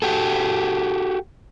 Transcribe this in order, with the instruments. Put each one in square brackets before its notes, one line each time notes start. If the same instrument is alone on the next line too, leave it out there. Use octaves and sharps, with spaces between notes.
[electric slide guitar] F#4 G4 A4